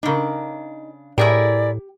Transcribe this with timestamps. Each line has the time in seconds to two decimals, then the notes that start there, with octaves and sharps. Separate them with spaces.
0.03 C#3 D4 D#4 A#4
1.18 A2 E4 G4 G#4 A#4 D5